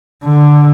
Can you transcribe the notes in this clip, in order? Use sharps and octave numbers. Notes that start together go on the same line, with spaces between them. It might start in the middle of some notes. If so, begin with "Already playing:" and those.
D3